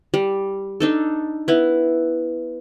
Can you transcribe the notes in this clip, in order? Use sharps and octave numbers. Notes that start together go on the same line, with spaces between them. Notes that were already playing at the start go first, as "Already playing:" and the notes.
G3
D4 D#4 A4
B3 E4